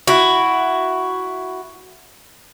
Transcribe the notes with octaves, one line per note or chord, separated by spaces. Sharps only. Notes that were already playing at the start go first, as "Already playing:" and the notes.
E4 F#4